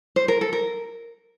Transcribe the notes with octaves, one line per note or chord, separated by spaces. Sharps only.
C5
A#4
A4
A#4